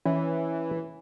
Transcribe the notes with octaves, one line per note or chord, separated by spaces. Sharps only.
E3 C#4